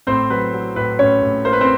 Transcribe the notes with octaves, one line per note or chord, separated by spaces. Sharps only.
A2 C4 C5
F#3 B4
F#3
A2 B4
A2 C#4 C#5
A2
A#3 C5
B4
C4 C5